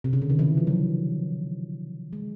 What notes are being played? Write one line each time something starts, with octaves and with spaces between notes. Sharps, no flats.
C3
C#3
D3
D#3
E3
F3
F#3
G#3